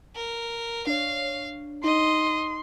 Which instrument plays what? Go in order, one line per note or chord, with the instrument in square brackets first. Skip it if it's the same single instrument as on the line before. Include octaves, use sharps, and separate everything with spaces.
[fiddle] A#4
[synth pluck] D4 C#5 [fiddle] F5
[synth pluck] D#4 [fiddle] D#5 [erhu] C6